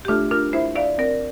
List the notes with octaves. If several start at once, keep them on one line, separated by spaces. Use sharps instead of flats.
G4
A3 D4 F4
D4 F4 A#4
E4 C5 E5
D5 E5 F5
C4 A#4 D5